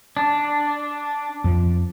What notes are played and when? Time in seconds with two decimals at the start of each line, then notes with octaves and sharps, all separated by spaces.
0.17 D4
1.44 F2 F3